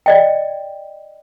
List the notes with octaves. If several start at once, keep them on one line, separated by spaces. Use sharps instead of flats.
D5 D#5 G5